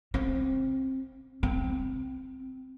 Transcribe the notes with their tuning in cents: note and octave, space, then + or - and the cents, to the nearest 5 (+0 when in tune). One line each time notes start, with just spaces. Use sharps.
C4 +20
C4 -10